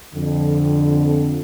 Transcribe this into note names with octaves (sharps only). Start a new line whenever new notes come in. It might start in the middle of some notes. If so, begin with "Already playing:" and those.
F2 D3